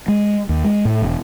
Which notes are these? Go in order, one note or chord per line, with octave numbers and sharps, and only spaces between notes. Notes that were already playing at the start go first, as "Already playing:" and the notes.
G#3
D#2
G#3
A2
E1